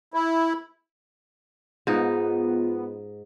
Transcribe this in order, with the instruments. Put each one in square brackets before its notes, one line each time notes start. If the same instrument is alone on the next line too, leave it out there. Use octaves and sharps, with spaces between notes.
[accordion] E4
[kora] G#2 D#4 [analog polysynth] B3 [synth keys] F4